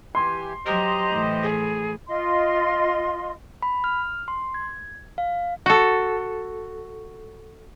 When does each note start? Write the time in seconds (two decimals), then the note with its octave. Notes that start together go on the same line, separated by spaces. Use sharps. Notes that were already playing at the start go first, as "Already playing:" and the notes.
0.15 E3 G4 G#5 C6
0.66 F#3 G4 C5 D#5 A#5
1.12 A2 E3
1.43 G#4
2.08 F4 D#5 C6
3.62 B5
3.84 F6
4.28 C6
4.54 G#6
5.18 F5
5.66 F#4 A4